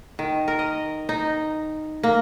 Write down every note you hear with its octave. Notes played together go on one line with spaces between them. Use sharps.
D#3
A#4
D#5
D#4
A#3